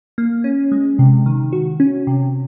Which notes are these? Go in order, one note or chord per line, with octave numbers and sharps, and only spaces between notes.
A#3
C#4
G#3
C3
D#3
F#4
C#4
C3